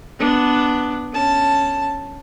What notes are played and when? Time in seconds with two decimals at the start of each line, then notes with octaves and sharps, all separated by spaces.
0.19 B3 D4
1.13 C#4 A5